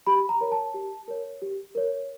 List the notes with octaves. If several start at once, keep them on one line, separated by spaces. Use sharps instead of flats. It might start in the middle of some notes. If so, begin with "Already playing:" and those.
G4 B5
A#5
A#4 C#5
A5
G4
A#4 C#5
G4
A#4 C#5